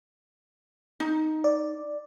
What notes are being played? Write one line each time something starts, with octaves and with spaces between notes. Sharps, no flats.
D#4
D5